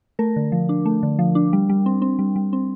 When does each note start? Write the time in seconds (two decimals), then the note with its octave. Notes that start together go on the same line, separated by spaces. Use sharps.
0.19 A3 A#4
0.36 D3
0.52 F3
0.69 D4
0.86 A3
1.03 D3
1.19 F3
1.35 D4
1.53 G3
1.69 G3
1.86 C4
2.02 C4
2.19 G3
2.36 G3
2.53 C4